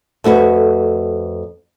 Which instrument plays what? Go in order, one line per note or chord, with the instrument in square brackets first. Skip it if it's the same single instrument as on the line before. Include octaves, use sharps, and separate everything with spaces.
[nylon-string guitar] F2 A3 F#4 B4